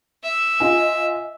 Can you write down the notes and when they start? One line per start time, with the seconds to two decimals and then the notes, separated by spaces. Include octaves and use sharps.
0.23 E5
0.60 F4 D#5 G#5